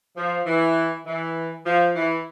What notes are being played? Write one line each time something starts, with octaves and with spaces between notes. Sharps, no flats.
F3
E3
E3
F3
E3